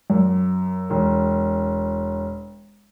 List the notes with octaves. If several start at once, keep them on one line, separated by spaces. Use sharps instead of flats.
F#2
E1